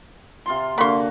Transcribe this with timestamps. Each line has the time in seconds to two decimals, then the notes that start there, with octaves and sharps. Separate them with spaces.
0.46 C3 F4 C6
0.78 D3 A#3 F#4 B5 C6